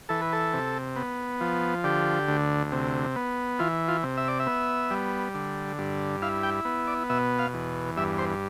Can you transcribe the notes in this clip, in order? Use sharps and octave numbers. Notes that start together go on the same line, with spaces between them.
E3 A4
B4
A4
C3
B3
F3
D3 G4
D2
C3
B3
E3 F4
F4
C3
E5
D5
E5
B3
G3
D3
G2
E4 F5
G5
B3
D5
B2 E5
F5
E2
G2 E5
C5